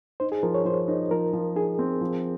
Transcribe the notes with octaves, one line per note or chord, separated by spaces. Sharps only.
D#4 C5
G#4
F3 A#4
C#5
F3 C5
D#4
F3 A#4
F3
D#4 G#4
C4
F3